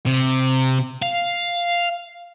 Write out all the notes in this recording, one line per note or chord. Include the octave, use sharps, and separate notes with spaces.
C3
F5